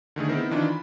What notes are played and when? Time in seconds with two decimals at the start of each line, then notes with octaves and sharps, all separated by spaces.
0.16 D3 D#3 A3 G#4
0.28 B3 C4 D#4 E4 A#4 C5
0.51 D#3 E3 D4 D#4 F4
0.65 B5